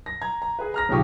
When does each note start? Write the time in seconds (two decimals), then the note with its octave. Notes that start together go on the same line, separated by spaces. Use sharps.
0.06 A#6
0.21 A#5 G#6
0.42 A#5
0.59 G#4 B4
0.74 A#5 F6 A#6
0.89 B1 C#3 F3 G4 C#6 D#6